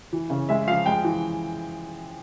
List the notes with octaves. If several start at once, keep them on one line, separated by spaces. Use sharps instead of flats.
E3
C#3
G#3 E5
F3 F5
G#3 G5
E3